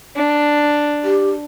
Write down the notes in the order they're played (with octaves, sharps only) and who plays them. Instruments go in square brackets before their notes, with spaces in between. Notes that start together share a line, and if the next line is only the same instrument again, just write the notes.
[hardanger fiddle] D4
[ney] G4